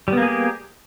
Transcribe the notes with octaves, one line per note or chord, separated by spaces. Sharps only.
G3 A#3 B3 G4 G#4